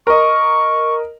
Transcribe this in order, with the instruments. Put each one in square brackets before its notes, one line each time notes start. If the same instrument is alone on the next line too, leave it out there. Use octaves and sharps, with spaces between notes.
[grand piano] A#4 D#5 [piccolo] C#6